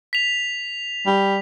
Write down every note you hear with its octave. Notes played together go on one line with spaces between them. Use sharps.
B6 F7
G3